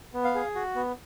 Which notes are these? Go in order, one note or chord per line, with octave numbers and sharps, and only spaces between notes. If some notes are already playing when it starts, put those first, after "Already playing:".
B3
F5
G#4
F#4
B3